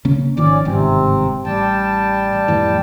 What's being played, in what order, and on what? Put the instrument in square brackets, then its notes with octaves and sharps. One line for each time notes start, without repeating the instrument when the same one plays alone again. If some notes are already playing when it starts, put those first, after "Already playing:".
[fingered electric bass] C#3 A#3 C#4
[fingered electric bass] G#1 D#3 F3 [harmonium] C#4 D5
[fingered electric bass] G1 G#2 D#3 [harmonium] C3 C4
[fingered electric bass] A1 [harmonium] G3 G5 A5
[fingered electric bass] F2 A2 E3